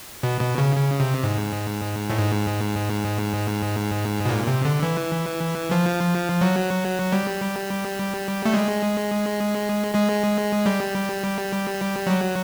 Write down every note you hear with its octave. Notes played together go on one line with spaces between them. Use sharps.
B2
B2
C#3
C#3
C3
G#2
A2
G#2
B2
A#2
C3
D3
E3
F3
F#3
G3
A3
G#3
G#3
G3
F#3